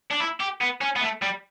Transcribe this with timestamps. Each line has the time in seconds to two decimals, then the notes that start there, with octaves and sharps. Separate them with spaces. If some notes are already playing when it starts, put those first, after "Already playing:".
0.11 D4
0.20 E4
0.40 G4
0.61 B3
0.81 C#4
0.96 B3
1.01 A3
1.22 G3